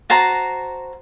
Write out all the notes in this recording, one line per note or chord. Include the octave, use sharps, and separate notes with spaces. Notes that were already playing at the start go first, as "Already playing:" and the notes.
F#4 C5 A5 A#5